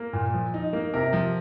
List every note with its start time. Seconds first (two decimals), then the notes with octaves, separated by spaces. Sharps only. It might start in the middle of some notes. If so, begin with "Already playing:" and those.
Already playing: A#3
0.13 A#2
0.34 F3
0.54 D#4
0.73 A#3
0.94 C3 A#4
1.13 F3